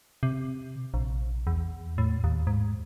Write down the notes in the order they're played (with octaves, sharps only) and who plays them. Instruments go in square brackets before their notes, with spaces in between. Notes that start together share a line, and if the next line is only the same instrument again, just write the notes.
[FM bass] C3
A#1
E2
A2
D#2
G#2